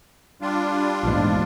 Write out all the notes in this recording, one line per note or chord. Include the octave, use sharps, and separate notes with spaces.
G3 D4 F4
A#1 E2 G#2